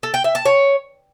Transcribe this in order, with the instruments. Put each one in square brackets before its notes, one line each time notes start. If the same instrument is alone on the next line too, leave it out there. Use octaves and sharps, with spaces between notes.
[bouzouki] A4
G5
E5
A5
C#5